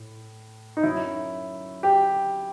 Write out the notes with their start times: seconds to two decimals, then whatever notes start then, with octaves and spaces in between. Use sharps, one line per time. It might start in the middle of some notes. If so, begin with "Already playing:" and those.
Already playing: A2
0.77 D#4
0.83 F#2 F#3 E4
1.83 G4